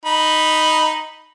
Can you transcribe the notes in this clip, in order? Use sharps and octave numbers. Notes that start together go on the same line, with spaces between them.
D#4 B5